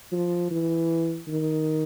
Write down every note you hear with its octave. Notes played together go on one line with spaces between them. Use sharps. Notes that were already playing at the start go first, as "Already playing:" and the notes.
F3
E3
D#3